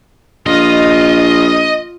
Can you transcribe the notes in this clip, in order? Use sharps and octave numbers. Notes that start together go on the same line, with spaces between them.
A#1 F4 D#5